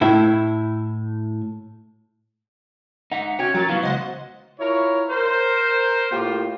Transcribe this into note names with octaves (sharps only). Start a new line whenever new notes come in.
A2 E4
G#2 D#4 E5 F#5
C3 C#4 F#4 C#5 G5
F3 F#3 A#4 A#5 A6
G#2 E3 B3 F#4 F5
C#2 C5 D#5 F#5
E4 F4 A#4 C#5
A#4 C5
A2 A#3 F4 G4